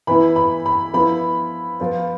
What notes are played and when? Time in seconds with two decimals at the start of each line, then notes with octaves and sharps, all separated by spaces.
0.07 E3 B3 E4 B5
0.36 B5
0.66 B5
0.94 F3 B3 E4 B5
1.80 F3 B3 F4